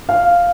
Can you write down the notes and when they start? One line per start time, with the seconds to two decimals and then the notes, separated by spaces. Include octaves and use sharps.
0.09 F5